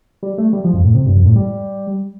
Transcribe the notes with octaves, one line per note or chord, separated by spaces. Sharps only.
G3
A3
G3
F3
F2
A2
C3
G2
F2
A2
G3